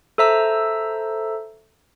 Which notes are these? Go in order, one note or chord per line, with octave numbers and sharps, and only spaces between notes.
A4 C5 E5 A#5 E6